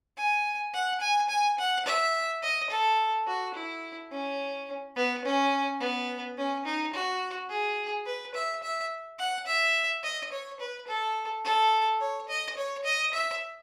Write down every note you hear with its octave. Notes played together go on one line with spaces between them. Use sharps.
G#5
F#5
G#5
G#5
F#5
E5
D#5
A4
F#4
E4
C#4
B3
C#4
B3
C#4
D#4
F#4
G#4
B4
E5
E5
F#5
E5
D#5
C#5
B4
A4
A4
C#5
D#5
C#5
D#5
E5